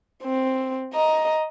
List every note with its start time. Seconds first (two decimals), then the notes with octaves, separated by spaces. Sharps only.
0.24 C4
0.93 D#5 A#5